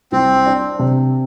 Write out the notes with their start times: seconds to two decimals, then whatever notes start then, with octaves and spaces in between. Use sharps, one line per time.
0.12 C2 C4
0.46 D4
0.79 C3